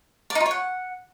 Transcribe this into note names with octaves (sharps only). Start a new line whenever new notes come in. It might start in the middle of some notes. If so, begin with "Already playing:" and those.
D5
D#4
F4
C#5
F#5